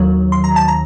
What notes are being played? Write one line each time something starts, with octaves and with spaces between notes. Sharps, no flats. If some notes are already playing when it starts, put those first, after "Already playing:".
Already playing: D#2 D#3 F#3
C6
A#5
A5
A#5